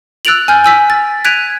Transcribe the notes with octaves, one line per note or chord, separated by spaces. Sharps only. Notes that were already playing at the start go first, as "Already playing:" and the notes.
E6 F#6 A6 D7 F7 F#7
G#5 F6 G6
G#5 E6 B6
A6
F#6 G#6 B6 D7 D#7 F7